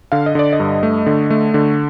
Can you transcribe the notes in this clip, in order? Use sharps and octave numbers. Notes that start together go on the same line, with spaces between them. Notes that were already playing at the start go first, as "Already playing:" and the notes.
D3 F5
D#5
D3 D5
D#5
G2
A3
D3
A3
D3